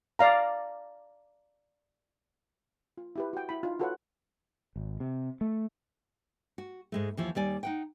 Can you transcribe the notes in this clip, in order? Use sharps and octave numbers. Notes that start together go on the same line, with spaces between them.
D5 F5 A#5
F4
E4 G4 B4
F#4 G5
E4 B5
D#4 F4
F4 F#4 A4 B4 C#5 F#5
G#1
C3
A3
F#4
G#2 G#3 A3
D#2 E3 F3
D#2 G3 D5 G#5
D#4 F#5 G5